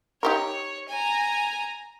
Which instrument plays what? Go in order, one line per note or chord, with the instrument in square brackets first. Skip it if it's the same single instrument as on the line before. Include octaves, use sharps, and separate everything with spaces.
[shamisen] D#4 G4 A#4 [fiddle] C#5
[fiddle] G#5 A#5